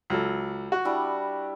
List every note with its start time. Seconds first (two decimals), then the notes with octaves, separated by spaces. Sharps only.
0.10 C#2 F#3 A4
0.72 F#4
0.85 G3 D4 E4